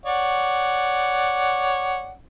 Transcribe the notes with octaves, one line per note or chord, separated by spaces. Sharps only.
C#5 D5 F#5